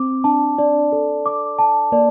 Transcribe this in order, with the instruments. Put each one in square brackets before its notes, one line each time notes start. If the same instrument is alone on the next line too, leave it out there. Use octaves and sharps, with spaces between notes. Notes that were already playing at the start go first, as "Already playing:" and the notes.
Already playing: [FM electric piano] C4 [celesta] D6
[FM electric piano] D4 [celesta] A5
[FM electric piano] D4 [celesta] D5
[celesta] A4
D6
A5
[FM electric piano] A#3 [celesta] D5